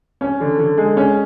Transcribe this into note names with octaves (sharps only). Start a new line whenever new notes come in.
C#4
D3
D3
G#3
C#4